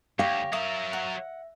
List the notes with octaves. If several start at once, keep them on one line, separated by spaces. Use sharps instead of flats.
D2 G4 C#5 F5 A#6
F#3 A#4 E5 D#6
F#5